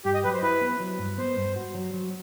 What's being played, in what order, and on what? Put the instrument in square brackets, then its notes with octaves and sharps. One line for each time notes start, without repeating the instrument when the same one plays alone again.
[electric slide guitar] G2 [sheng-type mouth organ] G4
[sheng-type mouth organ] D#5
[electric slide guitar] F#3 [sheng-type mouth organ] B4
[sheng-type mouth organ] C5
[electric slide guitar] E4 [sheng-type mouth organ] B4
[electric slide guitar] B3
F#3
G2
[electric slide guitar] B3 [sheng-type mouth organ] C5
[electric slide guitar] G2
F#4
F#3
F#3